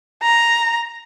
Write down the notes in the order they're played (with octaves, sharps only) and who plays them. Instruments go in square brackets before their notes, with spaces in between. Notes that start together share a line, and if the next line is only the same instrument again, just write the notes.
[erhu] A#5